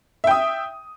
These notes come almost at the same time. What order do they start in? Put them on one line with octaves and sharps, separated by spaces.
E5 G5 D#6